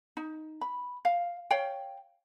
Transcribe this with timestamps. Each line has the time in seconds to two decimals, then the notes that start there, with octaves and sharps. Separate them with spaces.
0.17 D#4
0.61 B5
1.05 F5
1.50 C#5 F5 G5